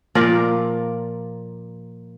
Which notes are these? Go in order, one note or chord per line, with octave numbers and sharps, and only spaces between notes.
A#2 F3 A#4 D5